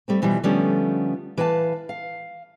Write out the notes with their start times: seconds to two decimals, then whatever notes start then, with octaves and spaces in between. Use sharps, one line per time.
0.08 G3 A3 C4
0.22 B2 E3 F3 G3
0.44 D3 F3 G3 A3 B3 C#4
1.37 E3 B4 F5 G5 A5
1.89 F5